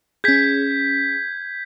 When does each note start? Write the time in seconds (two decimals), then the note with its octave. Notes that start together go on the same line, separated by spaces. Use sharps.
0.24 C#4 G#4 G6 G#6 B6